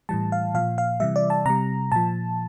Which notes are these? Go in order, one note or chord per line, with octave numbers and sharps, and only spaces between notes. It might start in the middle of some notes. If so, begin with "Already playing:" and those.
A2 E3 G3 A5
F5
A#2 F3 F5
F5
C3 E3 G3 E5
D5
A5
C3 G3 A#5
A#2 F3 A5